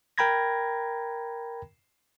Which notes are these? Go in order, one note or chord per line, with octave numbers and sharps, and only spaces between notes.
A#4 G5 A#5 B5 G#6 A#6